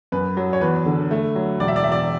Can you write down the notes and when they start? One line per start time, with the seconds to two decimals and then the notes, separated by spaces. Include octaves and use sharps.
0.12 F#2 B4
0.37 F#3
0.53 C#5
0.61 E2 B4
0.86 D3
1.11 A3
1.36 F#3
1.60 E1 D5
1.68 E5
1.76 D5
1.84 E2 E5
1.92 D5